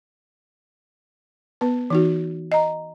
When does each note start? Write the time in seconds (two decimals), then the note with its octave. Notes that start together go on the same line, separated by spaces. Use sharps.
1.61 B3 B4
1.90 E3 D#4 F#4
2.52 D#5 A#5